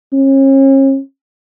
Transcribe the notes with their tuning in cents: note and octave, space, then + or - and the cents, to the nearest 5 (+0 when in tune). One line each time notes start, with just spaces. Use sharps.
C#4 -40